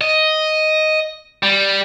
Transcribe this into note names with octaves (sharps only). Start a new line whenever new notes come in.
D#5
G3